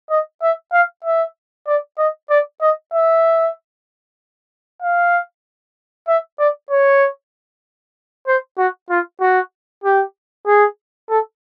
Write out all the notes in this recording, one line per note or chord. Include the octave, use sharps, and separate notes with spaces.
D#5
E5
F5
E5
D5
D#5
D5
D#5
E5
F5
E5
D5
C#5
C5
F#4
F4
F#4
G4
G#4
A4